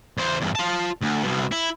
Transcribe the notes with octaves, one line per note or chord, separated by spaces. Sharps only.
E2 C5
E2 G2
F4 A5
D2
C2 B2
E4